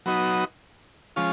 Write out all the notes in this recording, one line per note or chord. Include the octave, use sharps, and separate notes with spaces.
F#3 B3 D#4 F#4
F3 G#3 C#4 F4